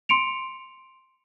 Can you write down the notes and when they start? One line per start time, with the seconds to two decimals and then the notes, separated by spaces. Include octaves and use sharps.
0.09 C6 C#7 D7 F7